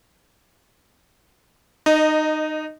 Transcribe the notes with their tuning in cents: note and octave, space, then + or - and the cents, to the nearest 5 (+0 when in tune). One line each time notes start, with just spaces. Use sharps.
D#4 -20 D#5 +0